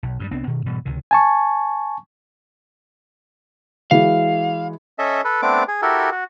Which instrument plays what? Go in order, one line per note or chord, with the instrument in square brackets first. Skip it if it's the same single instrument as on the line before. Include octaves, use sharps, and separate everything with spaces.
[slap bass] B1
G2 D#3 G3
C2 B3 C4 D4
B2 D#3
G#2 B2 E3 G3
C#2 C3 D#3
[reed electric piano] G#5 A5 C#6
[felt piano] E3 G#3 F#4 [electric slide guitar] F5
[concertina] C#4 A4 D#5 E5
A4 B4
A3 B3 C4 D4 D6
G#4
E4 F#4 G4 A4 A#4
F#4